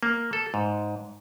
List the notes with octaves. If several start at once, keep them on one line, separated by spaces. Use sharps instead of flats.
A#3
A4
G#2